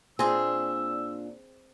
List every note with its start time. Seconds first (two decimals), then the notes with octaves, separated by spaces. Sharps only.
0.19 A#2 C4 D4 G#4 E6